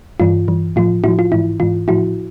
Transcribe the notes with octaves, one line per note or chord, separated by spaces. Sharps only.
G2 E3 F4
G2 E3
A2 F3 F4
A2 F3 E4 F#4
F4
G#2 E3 E4
G#2 E3 F4
A2 F3 E4 F#4